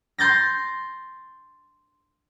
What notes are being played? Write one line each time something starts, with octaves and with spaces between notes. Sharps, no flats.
C6 G6 A6 A#6